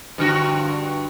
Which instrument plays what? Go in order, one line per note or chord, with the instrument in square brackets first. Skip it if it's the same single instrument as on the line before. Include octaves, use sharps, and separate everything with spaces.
[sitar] G2 D3 F#4